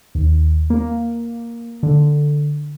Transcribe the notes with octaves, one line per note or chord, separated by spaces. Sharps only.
D#2
A#3
D3